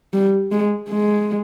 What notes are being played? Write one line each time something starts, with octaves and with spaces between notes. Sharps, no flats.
G3
G#3
G#3